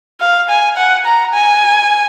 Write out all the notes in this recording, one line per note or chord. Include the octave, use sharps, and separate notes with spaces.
F5
G#5
F#5
A#5
G#5